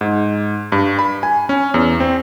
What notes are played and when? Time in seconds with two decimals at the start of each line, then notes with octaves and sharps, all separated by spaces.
0.01 G#2
0.72 G2
0.99 B5
1.23 G#5
1.49 C#4
1.74 E2
2.00 C4